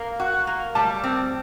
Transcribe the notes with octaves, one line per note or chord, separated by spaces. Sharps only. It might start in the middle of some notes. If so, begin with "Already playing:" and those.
Already playing: A#3
F#4
A#3
G3 A5
C4